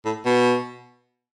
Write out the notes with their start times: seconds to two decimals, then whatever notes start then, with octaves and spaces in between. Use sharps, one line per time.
0.05 A2
0.25 B2